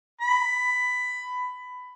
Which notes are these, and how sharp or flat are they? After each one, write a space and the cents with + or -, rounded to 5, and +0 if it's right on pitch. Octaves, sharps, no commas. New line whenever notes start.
B5 +15